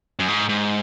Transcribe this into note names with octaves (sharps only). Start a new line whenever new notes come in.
F#2
G#2
G#2